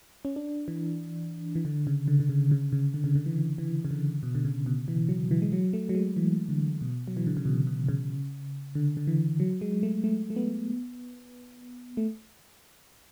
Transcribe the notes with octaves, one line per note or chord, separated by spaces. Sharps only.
C#4
D4
E3
E3
D3
C#3
D3
D3
C#3
C#3
C#3
D3
C#3
D3
E3
E3
C#3
D3
B2
D3
C#3
B2
E3
F#3
E3
G#3
F#3
A3
F#3
G#3
E3
D3
B2
F#3
E3
D3
C#3
B2
B2
C#3
D3
D3
E3
F#3
G#3
A3
A3
A3
B3
A3